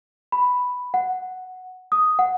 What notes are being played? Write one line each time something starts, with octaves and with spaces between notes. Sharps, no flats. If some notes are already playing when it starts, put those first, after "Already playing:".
B5
F#5
D#6
F#5